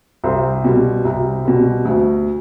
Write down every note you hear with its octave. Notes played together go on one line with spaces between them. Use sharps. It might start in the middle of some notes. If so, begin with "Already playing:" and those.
C2 C5
B2 G3
C2
B2 G3
D2